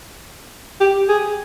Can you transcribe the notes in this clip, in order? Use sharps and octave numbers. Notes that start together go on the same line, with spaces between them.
G4
G#4